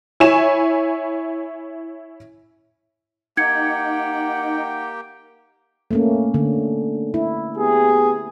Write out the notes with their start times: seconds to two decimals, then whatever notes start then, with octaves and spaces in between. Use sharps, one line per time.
0.20 E4 C#5 G#5 E7
3.37 A#3 D#4 G4 F#5 G5 G#6 C#7
5.91 A3 A#3 C#4
6.34 D3
7.14 E4
7.56 B3 G4 G#4